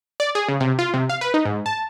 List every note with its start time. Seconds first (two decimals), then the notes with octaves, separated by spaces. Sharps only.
0.20 D5
0.35 G#4
0.49 C#3
0.60 C3
0.79 F4
0.94 C3
1.09 F5
1.21 B4
1.34 D#4
1.45 G#2
1.66 A5